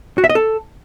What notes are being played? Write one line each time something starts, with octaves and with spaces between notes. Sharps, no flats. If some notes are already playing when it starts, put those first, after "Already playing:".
F#4
E5
D#5
A4